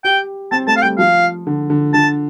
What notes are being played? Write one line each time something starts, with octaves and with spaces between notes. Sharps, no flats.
G4 G5
C4 A5
A3 A5
F5
G3 G5
F3 F5
D3
D3
D3 A5